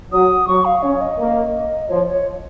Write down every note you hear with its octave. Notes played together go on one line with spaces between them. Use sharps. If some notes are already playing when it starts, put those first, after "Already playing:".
F#3 D#6
F#3 C#6
F5
C#4 C#5
D#5
A#3
F3 C#5
C#5